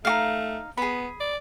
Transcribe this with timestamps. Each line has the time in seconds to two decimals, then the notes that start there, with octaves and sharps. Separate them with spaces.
0.05 A3 D#4 F#4 F5
0.77 B3 G#4 B5
1.20 D5